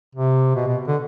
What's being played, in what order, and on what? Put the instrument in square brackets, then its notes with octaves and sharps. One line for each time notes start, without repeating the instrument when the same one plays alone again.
[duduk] C3
B2
B2
D3